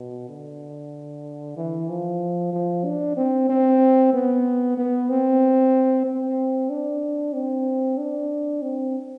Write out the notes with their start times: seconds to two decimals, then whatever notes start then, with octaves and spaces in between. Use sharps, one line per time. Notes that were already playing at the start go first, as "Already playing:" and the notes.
Already playing: B2
0.29 D3
1.56 E3
1.89 F3
2.53 F3
2.85 D4
3.17 C4
3.49 C4
4.13 B3
4.77 B3
5.10 C4
6.05 C4
6.70 D4
7.33 C4
7.98 D4
8.62 C4